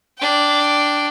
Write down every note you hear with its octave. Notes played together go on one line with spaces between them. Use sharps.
D4 G5